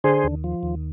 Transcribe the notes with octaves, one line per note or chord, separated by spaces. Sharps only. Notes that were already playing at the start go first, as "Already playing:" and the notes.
D3 G#4 C5
D#2
F3
D#2